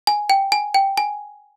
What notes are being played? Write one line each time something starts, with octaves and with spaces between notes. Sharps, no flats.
G#5
G5
G#5
G5
G#5